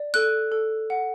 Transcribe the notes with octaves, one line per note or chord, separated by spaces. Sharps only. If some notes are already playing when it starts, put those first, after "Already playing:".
Already playing: D5
A4 F#6
A4
F#5